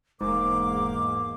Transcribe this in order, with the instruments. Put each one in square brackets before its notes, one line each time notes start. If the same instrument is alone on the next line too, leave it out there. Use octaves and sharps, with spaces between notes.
[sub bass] E1 [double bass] E2 A#3 [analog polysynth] G#2 [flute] D6